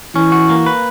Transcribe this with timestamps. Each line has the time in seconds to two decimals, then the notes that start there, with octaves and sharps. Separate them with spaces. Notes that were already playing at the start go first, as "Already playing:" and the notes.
0.15 E3 C#4
0.32 F#4
0.50 A#3
0.66 B4